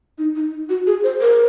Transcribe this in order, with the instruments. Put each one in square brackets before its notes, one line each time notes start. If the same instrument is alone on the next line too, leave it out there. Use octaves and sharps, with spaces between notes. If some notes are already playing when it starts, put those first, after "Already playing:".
[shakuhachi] D#4
D#4
F#4
G#4
C5
A#4